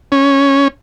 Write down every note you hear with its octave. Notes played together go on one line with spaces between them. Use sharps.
C#4